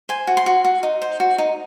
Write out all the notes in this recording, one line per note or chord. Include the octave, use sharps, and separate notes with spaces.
C5 G#5
F#4
C6
F#4
F#4
D#4
C5
F#4
D#4